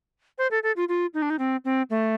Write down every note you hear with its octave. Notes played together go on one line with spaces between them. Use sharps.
C5
A4
A4
F4
F4
D#4
D4
D#4
C4
C4
A3